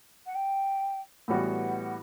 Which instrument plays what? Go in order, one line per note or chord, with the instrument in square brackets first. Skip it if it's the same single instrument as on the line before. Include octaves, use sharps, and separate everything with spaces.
[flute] F#5
G5
[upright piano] A2 E3 G3 B3 F#4 [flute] F#5